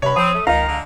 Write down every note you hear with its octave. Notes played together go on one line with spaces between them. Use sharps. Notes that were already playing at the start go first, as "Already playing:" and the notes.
G2 C3 C#5 B5
F3 C4 D#6
A3
C#2 D#3 F5 A#5
D3 G#3